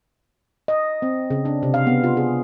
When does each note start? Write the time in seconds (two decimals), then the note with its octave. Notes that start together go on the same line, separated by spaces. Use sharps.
0.68 D#5
1.02 C4
1.30 C#3
1.45 D4
1.63 C3
1.74 F5
1.87 B3
2.04 F4
2.17 G#4